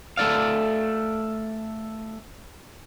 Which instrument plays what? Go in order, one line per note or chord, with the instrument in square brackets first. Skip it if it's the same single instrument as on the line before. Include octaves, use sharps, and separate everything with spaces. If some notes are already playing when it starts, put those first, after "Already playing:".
[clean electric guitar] A3 A4 D5 F5